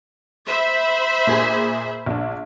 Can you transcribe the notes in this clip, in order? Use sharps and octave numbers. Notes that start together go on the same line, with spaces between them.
C5 E5 B5
A#2 G#4 G#5
A#1 D4